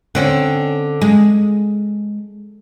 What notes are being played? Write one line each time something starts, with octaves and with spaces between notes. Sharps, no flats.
D3 C4 C#4
G#3